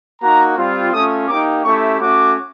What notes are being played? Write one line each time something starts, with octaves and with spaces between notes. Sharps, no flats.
A#3 D#4 F#4 A#5
G3 C4 F4
A3 C#4 F4 D#6
A#3 D#4 G4 D6
A3 C#4 E4 G4 C#6
A3 C#4 F#4 D6